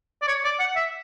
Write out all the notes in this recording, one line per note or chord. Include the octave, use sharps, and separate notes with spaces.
D5
C#5
D5
F#5
E5